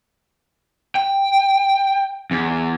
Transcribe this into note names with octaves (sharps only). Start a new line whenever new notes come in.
G5
E2